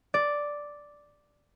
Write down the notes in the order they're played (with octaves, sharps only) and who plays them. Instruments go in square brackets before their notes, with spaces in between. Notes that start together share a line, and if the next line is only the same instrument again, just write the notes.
[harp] D5